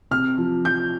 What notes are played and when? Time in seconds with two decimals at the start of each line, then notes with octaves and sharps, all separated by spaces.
0.11 C3 F6
0.38 F3
0.64 F3 G6